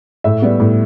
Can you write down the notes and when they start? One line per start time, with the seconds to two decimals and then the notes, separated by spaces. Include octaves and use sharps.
0.24 A2 E5
0.42 G3 B3
0.60 A2